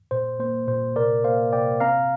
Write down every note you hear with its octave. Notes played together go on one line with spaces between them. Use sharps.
A#2 C5
A#3 C5
A#2 C5
C3 A#4 D5
A#3 C5 F5
C3 D5 G5
C4 F5 A#5